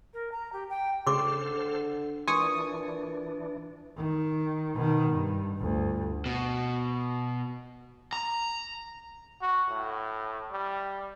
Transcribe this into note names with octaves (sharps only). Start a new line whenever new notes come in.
A#4
A#5
G4
G5
D2 C#3 A4 C5 C6 D6 F6
D3
A#2 E3 D4 G#5 C6 C#6 D#6
D#3
B2 D#3
G2
G1 D2
B2
A#5
F#4
A2
G3